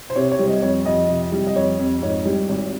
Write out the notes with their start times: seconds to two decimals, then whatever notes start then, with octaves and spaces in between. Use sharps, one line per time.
0.10 C5
0.16 C3 C#5
0.31 C#5
0.39 G3
0.47 D#5
0.62 F2 C#5
0.85 F2 D#5
1.08 C3
1.32 G3
1.47 D#5
1.56 F2 C#5
1.79 F2
2.02 G#2 C#5
2.25 G3
2.48 G#1